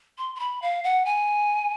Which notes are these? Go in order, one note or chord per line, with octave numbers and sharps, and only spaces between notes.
C6
C6
B5
F5
F#5
G#5